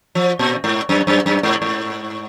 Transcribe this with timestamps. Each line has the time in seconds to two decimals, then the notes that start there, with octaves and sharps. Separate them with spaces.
0.15 F3
0.39 A#2
0.64 G#2
0.89 F#2
1.07 F#2
1.26 F#2
1.43 G#2
1.62 G#2